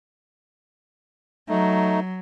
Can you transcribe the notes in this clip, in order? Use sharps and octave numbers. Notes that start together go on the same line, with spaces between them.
F#3 A3 D#4